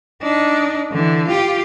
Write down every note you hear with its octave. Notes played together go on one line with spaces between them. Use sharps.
D4 D#4
D3 E3
F4 G4